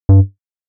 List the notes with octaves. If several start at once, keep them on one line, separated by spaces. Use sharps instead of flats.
G2